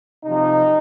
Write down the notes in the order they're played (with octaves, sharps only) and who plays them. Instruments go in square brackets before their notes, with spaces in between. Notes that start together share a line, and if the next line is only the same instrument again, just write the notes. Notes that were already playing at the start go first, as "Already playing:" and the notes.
[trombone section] C3 F3 D#4